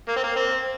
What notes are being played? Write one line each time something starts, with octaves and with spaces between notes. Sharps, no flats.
A#3
C4
A#3
C4